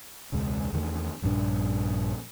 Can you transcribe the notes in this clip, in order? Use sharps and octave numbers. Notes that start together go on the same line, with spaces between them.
E1 C#2 G#3
E2 D#3 A3
A#1 G2 D#3 D4